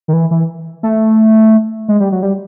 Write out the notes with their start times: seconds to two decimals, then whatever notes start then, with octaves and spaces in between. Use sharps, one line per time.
0.08 D#3
0.13 E3
0.31 E3
0.83 A3
1.89 G#3
2.00 G3
2.12 F#3
2.23 G3